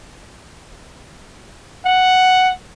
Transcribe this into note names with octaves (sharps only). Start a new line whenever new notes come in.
F#5